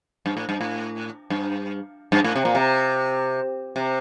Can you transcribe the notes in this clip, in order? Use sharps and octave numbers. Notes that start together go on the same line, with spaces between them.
G2
A2
G2
A2
G2
G2
A2
C3
A#2
C3
C3